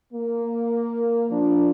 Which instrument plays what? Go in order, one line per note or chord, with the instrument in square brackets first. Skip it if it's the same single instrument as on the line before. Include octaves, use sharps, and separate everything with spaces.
[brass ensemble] A#3
F3 D4